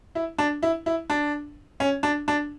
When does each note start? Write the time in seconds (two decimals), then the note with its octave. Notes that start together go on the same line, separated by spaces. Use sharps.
0.15 E4
0.38 D4
0.63 E4
0.86 E4
1.10 D4
1.80 C#4
2.03 D4
2.28 D4